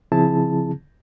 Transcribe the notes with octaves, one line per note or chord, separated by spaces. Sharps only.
C#3 F3 C4 E4 G#4 A5